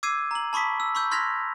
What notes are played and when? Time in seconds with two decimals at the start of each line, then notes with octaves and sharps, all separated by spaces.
0.03 D6 E6 G#6 C7 D#7
0.31 A#5 F#7
0.53 A5 B5 C#6 D#6 B6
0.80 E6
0.95 B5 C#6 E6 G6
1.11 C6 F6 G#6 A#6 B6 F7